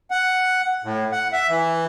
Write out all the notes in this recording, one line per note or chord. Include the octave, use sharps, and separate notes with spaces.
F#5
A2
F#5
E5
E3